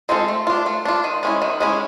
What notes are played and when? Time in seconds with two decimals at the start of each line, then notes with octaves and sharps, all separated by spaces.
0.09 G#3 C4 F4 A4
0.28 A3
0.47 D4 F4
0.66 A3
0.85 D4 F4
1.04 D#3
1.23 G#3 C#4 E4
1.42 D#3
1.60 G#3 C#4 E4